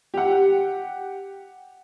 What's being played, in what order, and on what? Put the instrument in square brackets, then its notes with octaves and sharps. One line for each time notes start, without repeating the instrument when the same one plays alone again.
[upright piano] G4 F#5